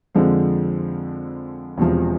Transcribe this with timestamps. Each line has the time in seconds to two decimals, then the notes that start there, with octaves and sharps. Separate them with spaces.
0.15 F2 D3 F3 G#3 C4
1.78 E1 E2 C3 F3